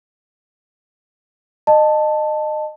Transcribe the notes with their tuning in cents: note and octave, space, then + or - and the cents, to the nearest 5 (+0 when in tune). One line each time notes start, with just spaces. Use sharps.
D#5 -25 A5 +5